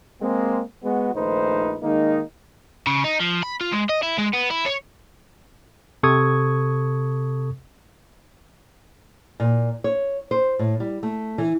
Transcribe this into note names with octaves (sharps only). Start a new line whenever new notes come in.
G#3 A#3 C4
G#3 B3 F#4
A#1 D#3 A3 D#4 B4 C5
D#3 G#3 A#3 D#4
C#3
D#4
F3
B5
F4
G#3
D#5
E4
G#3
B3
E4
C#5
C3 A4 C#6 D#6 G#6
A#2
C#5
C5
A2
G3
A3
E3